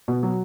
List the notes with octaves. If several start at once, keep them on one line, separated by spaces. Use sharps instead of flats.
B2
F#3